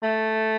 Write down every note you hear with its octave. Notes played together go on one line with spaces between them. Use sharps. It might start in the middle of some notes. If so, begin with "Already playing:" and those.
A3